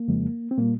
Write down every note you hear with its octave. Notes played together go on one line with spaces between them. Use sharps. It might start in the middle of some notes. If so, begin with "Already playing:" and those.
Already playing: A#3
F2 C#3 F3 G#3
C4
A#2 G3 A#3